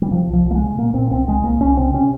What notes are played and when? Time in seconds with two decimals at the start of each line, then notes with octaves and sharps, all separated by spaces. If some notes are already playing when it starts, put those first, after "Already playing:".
0.02 G3
0.11 C3 F3
0.28 C2
0.33 F3
0.45 C2
0.51 A#3
0.55 G#3
0.61 C3
0.78 A#2 A#3
0.94 A#2 C4
1.11 C2 C4
1.28 C2 G#3
1.44 C2 A#3
1.60 C2 C#4
1.77 C3 C4
1.93 C3 C#4